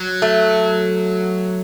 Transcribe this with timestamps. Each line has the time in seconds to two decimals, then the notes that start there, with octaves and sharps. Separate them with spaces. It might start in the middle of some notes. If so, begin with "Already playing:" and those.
Already playing: F#3
0.22 A3